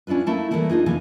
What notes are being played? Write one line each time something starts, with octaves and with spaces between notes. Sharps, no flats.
C#4 D4 E4 F4 B4
A3 A#3 E4 A5
E3 F3 G3 A3 A#3 E4
D4 D#4 F4 G#4
F2 C3 E3 A#3 G#5